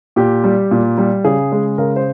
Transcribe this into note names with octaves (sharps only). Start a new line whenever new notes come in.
A#2 G4
G3
A#2
G3
C#3 G#4
G#3
C#3 A#4
C5